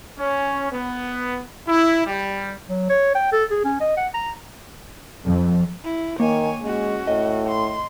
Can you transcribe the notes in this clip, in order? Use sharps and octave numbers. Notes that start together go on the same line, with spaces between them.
C#4
B3
E4
G3
F#3
C#5
G5
A4
G#4
C#4
D#5
F#5
A#5
F2
E4
D#3 A#3 C#5 G#5
G#3 C#4 F#4
A2 D#5
C6